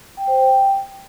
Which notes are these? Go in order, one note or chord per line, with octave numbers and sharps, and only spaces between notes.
G5
C5
G5